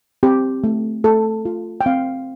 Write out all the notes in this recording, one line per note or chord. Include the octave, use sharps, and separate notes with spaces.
C4 G4
A3
A3 A4
F4
G5
C4 F5